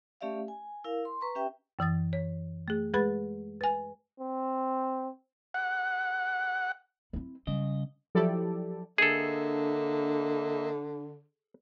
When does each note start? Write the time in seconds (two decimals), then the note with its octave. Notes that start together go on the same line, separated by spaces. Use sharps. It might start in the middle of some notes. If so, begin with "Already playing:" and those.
0.21 A3 C#4 G4 D5 E5 F5
0.48 G#5
0.84 E4 A#4 F5
1.05 C6
1.21 B4 A#5 C#6
1.35 C#4 G4 E5 G5
1.79 F#2 E3 D#6 A6
2.13 C#5
2.68 A3 G#4
2.94 G#3 G#4 B4 B5 A6
3.61 B4 G#5
4.20 C4
5.54 F#5
7.13 C4 E4
7.47 C#3 G3 D#5
8.15 F3 F#3 E4 G4 A4 D5
8.98 D3 A#3 D4 G#4 A4 D#5 E5